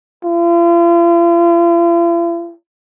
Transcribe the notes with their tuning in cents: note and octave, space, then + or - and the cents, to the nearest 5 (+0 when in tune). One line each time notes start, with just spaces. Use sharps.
F4 -45